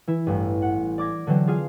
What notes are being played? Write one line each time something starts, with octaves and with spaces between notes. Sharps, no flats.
E3 E4
A1 G2
F#5
D5 D6 G#6 A#6
D3 E3 F#3 C4
F4 G#4 F5